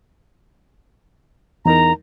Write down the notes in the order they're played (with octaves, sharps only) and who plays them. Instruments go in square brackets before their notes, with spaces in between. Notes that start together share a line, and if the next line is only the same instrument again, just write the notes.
[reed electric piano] E2 D#4 A#4 [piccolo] A#5